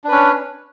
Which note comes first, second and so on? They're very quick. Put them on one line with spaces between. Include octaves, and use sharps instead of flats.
D4 B4 C#4